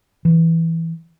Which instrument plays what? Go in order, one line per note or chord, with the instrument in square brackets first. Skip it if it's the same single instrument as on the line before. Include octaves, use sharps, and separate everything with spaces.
[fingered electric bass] E3